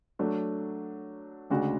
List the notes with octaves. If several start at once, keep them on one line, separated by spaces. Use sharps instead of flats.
F#3 A3 D4
D2 C#3 G#3 D4 F#4